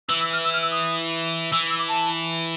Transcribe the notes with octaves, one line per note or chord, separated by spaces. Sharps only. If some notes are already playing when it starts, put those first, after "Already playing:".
E3 E6
E6
F6
E6
F6
E6
D#6
E3 E6
E6
D6
A5